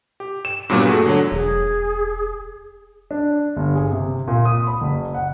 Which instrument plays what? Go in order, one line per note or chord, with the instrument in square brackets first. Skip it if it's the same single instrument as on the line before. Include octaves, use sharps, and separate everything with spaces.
[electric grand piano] G4
E7
G2 A#2 F#3 G3 A#3 B3
A3 F#4 G#4
D3 F#3
[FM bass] E1 [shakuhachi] G#4
[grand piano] D4
G1
G#4
C3
A#2
D#6
B5
F#1
F#5